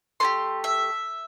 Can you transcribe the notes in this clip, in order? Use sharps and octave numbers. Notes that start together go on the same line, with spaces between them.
A3 E4 G4 C6
E5